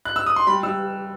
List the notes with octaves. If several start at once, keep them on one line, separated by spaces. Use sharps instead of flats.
F#6
E6
D#6
C6
G3 B5
G3 E6